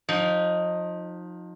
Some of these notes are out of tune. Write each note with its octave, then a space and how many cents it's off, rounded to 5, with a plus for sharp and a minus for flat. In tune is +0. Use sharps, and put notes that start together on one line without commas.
F3 +30 D#4 +0